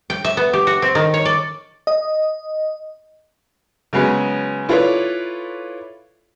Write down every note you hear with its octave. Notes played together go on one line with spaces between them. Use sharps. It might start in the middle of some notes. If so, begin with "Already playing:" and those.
G5
E5
B3
G4
F#4
C4
D#3
C#5
D5
D#5
C#3 F#3 G#3 B3
E4 F4 A4 B4 C#5 D5